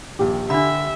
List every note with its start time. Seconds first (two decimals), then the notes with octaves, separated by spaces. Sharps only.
0.19 A#1 D#2 G4
0.50 D3 D4 E5 B5